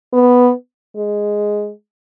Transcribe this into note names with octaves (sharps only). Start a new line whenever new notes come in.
B3
G#3